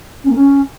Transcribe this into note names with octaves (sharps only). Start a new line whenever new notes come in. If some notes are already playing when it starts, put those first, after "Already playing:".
C#4
A#3
C#4